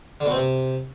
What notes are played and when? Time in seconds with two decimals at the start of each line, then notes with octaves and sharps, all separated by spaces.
0.20 D3
0.26 B2
0.31 C4
0.36 C3